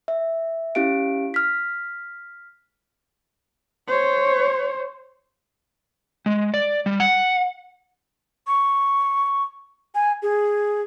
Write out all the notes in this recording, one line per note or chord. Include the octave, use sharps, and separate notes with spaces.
E5
C#4 E4 G4 F5 D7
F6 B6
C5 C#5
G#3
D5
G3
F#5
C#6
G#5
G#4